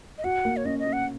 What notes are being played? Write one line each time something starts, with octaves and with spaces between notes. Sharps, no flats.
D#5
F#4 F#5
A#3
C#5
C#4 D#5
D#5
C#4
F#5